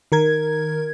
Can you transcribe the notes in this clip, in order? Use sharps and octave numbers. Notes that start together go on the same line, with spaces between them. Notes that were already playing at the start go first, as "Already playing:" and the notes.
D#3 A#4 G#6